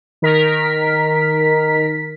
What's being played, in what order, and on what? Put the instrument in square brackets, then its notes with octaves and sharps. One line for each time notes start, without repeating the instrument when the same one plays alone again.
[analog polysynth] D#3 A#4 B6